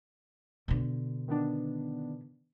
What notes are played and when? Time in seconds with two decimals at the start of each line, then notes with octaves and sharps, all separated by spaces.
0.68 B2 D3
1.28 D#3 B3 D4